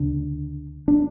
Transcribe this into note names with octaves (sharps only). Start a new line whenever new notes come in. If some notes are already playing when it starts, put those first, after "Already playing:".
Already playing: D2 C#3 D4
D4